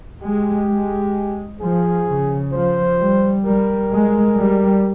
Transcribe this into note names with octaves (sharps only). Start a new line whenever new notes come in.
G#3 G4
G#3
F3 G#4
C#3
F3 C5
G3
G3 A#4
G#3
G3